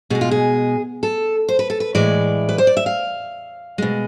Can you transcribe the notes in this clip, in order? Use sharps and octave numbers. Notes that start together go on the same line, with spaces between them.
B2 G#3 G#4
F4
G#4
A4
C5
B4
A4
B4
A2 E3 G#3 D5
B4
C5
D5
E5
F5
B2 G#3